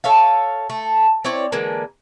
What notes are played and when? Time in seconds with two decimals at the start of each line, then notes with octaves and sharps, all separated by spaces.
0.04 A4 C#5 E5 F5
0.70 A3
1.24 C4 E4 C#5 D5
1.52 D3 E3 G#3 A#3